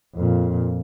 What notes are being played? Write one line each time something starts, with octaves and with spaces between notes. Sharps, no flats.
F2 A#2